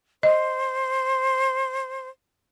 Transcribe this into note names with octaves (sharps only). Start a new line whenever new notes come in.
C5 D#5